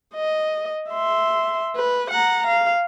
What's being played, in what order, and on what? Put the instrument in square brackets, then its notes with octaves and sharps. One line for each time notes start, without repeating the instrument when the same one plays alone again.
[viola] D#5
E5 C6
B4
F#5 A#5
F5